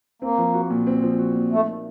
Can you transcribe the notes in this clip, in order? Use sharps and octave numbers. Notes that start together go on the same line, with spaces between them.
A#3 C4
F3
F#4
A#2
C4
F3
F#4
A#2
A3 D#4
A#3